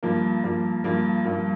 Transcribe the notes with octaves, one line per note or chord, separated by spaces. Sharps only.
G2 F3 A#3
G2 F3 A#3
G2 F3 A#3
G2 F3 A#3